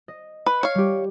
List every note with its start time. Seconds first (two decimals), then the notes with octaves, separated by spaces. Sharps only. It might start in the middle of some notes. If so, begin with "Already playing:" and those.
0.08 D#5
0.46 B4
0.63 C#5 F5
0.75 G3 G4